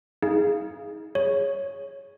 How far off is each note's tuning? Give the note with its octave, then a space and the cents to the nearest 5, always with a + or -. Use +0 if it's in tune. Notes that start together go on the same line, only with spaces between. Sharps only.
D#4 +40 G#4 +0 F5 -10
G#4 +0 C#5 +0